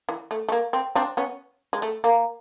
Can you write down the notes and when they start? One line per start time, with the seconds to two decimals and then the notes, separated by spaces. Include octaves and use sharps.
0.09 E3
0.31 A3
0.49 A3
0.52 A#3
0.73 C4
0.95 C4 D4
1.17 B3 C#4
1.73 G#3
1.82 A3
2.04 A#3